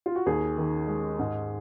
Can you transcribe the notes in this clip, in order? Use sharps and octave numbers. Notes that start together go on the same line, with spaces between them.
F4
F#4
D#2 G#4
D#3
G#3
G#2